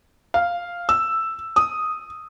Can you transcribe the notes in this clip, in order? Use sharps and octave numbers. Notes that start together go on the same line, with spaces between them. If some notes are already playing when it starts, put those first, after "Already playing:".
F5
E6
D#6